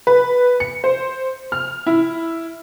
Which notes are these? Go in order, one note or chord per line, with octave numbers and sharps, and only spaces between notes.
B4
C#7
C5
F6
E4